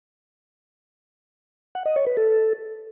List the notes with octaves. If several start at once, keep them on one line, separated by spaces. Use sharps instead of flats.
F#5
D#5
C#5
B4
A4